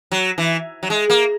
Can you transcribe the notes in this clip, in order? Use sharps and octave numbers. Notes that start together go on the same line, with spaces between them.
F#3
E3
F#3
G#3
A#3